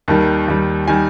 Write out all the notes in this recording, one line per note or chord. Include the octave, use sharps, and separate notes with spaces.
D#2 D#3 G3 A5
D#2 D#3 G3
D#3 G3 G#5